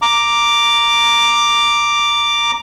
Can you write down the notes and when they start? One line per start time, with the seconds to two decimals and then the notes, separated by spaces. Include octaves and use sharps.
0.02 A#5 D6